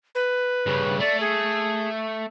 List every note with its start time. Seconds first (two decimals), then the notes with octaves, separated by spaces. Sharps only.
0.15 B4
0.66 G2 C#3
1.00 A3 D5
1.20 G#4